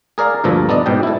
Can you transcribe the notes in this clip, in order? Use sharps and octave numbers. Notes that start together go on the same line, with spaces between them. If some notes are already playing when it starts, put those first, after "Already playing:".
G#4 A#4 D5 F5
D2 G2 A#2 F3 A4 A#5
B3 D4 D5 D#5
G#2 B2 G5
E4 A4